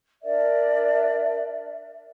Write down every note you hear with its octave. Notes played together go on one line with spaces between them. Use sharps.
D4 A#4 D5 E5